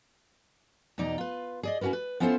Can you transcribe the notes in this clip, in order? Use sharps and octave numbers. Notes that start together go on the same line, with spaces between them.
E2 B2 D#4 D5 A#5
F4 B4
G#4 D5 D#5
C#4 E4 F#4 A#4 B4
B4
B3 C#4 E4 F4 A4 C5